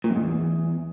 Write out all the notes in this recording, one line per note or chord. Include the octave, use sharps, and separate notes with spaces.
A#2
F#2
G#2
E2